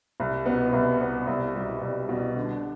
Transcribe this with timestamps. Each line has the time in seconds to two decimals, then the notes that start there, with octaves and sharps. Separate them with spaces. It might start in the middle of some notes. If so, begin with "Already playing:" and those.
0.20 C2
0.46 B2 B3
0.73 C2
1.01 B2 B3
1.27 C2
1.55 B2 G3
1.82 C2
2.09 B2 G3
2.36 D3